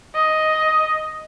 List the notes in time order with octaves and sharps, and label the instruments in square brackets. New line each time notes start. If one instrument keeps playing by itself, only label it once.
[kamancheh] D#5